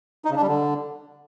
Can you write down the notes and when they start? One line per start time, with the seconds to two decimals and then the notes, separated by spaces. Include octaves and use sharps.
0.25 D#4
0.31 C#3
0.36 D4
0.42 G3
0.48 D3